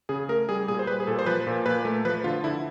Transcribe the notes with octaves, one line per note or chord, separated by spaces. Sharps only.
C#3 G#4
A3 A#4
G3 G#4
A#2 G#4
C5
G3 B4
G#4
A#2 A4
C5
F3 B4
A#2
A#2 B4
A3
F3 B4
D3 F4
D3 E4